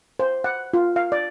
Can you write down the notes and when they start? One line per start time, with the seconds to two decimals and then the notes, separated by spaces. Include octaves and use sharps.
0.19 C5
0.44 F#5
0.73 F4
0.96 F5
1.12 D5